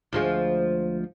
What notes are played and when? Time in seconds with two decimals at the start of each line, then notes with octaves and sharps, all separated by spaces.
0.13 D2 F3 G#3